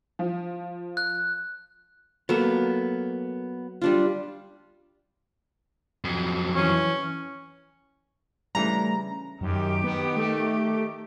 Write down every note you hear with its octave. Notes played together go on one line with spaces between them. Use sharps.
F3
F#6
F#3 A#3 B3 A4
G3 D4 F4
F2 F#3
E3 C#4
C#3 E3 G3 A3 D4 A#5
F#2 D#3 G4
B3
A3